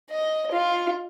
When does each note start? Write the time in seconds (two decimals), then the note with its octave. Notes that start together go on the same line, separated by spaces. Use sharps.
0.11 D#5
0.51 F4